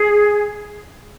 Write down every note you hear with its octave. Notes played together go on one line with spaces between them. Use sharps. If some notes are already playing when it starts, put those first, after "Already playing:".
Already playing: G#4